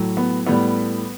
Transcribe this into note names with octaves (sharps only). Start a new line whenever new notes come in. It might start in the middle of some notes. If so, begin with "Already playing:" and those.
Already playing: A2 F#3
B3
A2 G3 B3